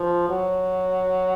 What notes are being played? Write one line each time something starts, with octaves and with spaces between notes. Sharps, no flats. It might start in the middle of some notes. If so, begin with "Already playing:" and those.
Already playing: F3
F#3